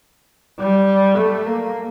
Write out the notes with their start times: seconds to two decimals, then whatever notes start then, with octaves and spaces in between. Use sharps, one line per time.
0.58 G3
1.18 A3
1.46 A#3